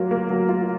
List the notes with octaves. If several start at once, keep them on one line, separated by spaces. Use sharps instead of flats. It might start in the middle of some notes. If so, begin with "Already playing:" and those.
Already playing: F#3 A#3 F4
A#3
F#3
F4